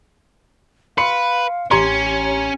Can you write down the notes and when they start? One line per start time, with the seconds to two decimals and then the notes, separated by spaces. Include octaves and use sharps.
0.98 B4 F5 C6 C#7
1.71 A1 C#4 G4 C#5 A#5 C6 G#6